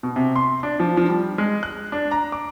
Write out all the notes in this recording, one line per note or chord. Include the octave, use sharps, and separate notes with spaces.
B2
C3
C6
D4
F3
F3
G3
G#3
F#6
D4
A#5
D6